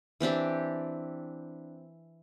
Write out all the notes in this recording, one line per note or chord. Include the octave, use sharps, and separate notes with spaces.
E3 C4 D4 G4